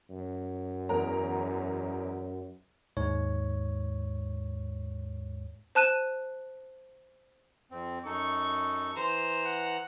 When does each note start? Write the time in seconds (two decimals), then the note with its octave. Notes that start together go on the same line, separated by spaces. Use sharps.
0.10 F#2
0.89 E2 A#4 A#5
2.97 D#2 G#2 G#3 C#5
5.75 C5 A5 F#6 D#7 E7
7.71 F2 C4
8.05 F#2 D#4 A4 C#6
8.96 E3 C5 A#5
9.45 F#5